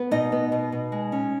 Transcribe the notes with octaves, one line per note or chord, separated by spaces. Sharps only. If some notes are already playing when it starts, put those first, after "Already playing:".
Already playing: B3
B2 D#4 D#5
B3
B2
B2
G#3
C#4